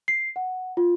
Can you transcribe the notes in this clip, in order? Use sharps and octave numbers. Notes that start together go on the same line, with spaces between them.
C7
F#5
F4